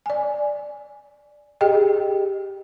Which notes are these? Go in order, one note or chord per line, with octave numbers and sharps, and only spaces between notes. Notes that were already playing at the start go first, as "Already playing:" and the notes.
D5 G#5
G4 G#4 D#5 G5